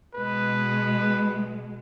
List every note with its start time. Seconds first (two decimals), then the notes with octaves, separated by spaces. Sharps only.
0.14 B2 G#3 B4